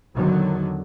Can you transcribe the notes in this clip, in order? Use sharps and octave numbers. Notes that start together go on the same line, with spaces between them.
E2 D3 D#3 F#3